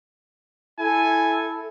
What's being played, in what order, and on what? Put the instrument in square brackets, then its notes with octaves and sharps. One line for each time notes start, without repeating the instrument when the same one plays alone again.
[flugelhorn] E4 [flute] A4 [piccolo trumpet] G#5